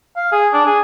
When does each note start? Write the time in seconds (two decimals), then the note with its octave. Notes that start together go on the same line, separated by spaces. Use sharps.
0.16 F5
0.32 G#4
0.53 D4
0.66 G#4